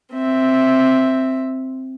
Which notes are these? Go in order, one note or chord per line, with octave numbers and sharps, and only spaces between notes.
C4 E5